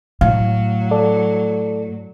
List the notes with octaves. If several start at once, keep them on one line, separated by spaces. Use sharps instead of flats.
A2 F#3 F5
A4 D5